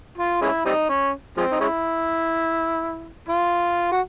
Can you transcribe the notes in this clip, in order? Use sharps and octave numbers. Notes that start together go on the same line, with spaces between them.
F4
G#3 C#4 E4
G3 C4 D#4
C#4
F3 G#3 C4
D#4
G#3 C#4 E4
F4
F#4